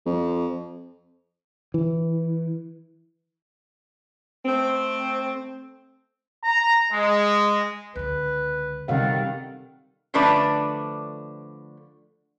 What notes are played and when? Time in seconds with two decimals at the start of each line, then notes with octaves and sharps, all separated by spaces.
0.06 F2
1.74 E3
4.45 A3 C4
6.44 A#5
6.92 G#3
7.96 C#2 D3 B4
8.88 C3 D#3 G3 A4 F5 F#5
10.14 D3 F3 A3 D4 B4 D5